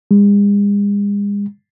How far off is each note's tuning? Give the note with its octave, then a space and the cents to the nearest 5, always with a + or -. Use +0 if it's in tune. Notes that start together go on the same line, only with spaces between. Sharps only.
G#3 -40